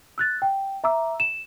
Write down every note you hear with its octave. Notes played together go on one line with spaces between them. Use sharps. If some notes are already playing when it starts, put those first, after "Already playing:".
E6 F#6 A6
G5
E5 A#5 D6 E6
E7